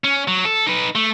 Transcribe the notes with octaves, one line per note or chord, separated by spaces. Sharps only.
C#4
F#3
A4
D#4 B4
A3